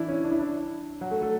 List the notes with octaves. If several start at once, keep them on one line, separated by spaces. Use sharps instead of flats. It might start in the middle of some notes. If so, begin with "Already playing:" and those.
Already playing: E3 D4 E4
C#4
D4
E4
D4
F#3 F#4
A3 A4
A3 A4